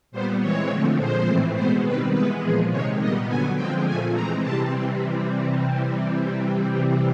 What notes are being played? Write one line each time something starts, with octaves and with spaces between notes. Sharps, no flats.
A#2 G3 B3 C5
E3 G#3 C4 C#5
D3 F3 A3 C4
A#2 F3 G#3 C5
A2 E3 A3 C4
B2 G#3 B3 C5
D#3 G3 C4 B4
E3 G#3 B3 B4
A#2 F3 G#3 G#4
C3 D#3 G#3 C#5
A#2 G3 B3 D#5
D3 F#3 B3 G#5
D3 F3 G#3 C4 G5
A#2 F3 A3 G#5
E3 G#3 C4 A#5
C3 E3 G3 C4 A5